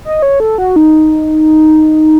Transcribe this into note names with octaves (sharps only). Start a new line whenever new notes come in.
D#5
C#5
A4
F#4
D#4